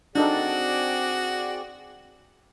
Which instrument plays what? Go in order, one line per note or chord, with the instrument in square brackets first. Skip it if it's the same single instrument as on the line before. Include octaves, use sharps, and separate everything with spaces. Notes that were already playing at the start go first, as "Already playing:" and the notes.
[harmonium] C4 G#4 D5 [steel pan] D4 D#4 A4 [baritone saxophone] F#4